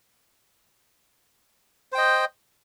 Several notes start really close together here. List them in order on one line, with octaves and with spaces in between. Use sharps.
C5 G5 D#5